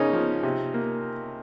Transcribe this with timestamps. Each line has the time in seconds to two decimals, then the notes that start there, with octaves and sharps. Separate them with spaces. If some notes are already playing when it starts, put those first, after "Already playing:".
Already playing: C#3 A#3 C#4 D#4
0.13 F3
0.43 C3
0.74 A#3